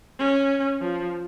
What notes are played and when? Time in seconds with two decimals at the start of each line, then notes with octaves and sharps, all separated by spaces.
0.19 C#4
0.81 F3